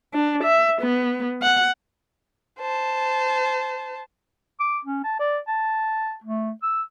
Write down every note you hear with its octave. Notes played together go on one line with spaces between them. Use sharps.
D4
E5
B3
F#5
C5 A5
D6
C#4
A5
D5
A5
A3
E6